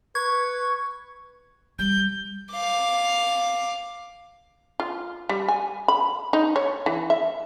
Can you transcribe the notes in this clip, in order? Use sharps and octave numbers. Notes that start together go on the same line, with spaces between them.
B4 C#6 G#6
G3 G6
F5 D6
F4
G3
G#5
B5
D#4
C#5
E3
E5